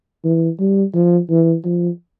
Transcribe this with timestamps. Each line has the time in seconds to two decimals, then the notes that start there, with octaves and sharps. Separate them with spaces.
0.25 E3
0.60 G3
0.94 F3
1.30 E3
1.65 F3